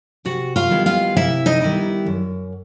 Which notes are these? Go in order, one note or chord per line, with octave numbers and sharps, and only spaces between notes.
C3 F#4 F#5
F4 F5
D#3 G3 B3 E4
F4 F5
C3 E4 E5
D#4 D#5
D#3 G3 B3 E4
F#2